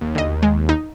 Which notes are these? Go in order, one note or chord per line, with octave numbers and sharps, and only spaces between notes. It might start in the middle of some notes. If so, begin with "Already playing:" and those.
D#2
D2 D#5
G#3
D#4